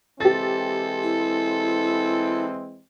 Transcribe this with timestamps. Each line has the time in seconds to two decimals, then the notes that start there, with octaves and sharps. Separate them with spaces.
0.21 E3 G#3 C4 G4 A4 A6
1.03 E4